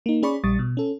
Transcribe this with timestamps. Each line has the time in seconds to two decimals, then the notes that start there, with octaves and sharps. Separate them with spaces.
0.06 A#3 D#4
0.23 C#4 G#4 D5 B5 C#6
0.44 A#1 G3 C#6 D#6 A6
0.59 B2
0.77 C#4 A4